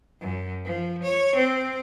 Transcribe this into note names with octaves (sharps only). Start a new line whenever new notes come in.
F#2
F3
C#5
C4